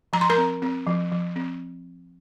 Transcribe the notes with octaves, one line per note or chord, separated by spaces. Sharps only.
F3 A#5
C6
A#4 A#5
C4
C4
F3
F3
C4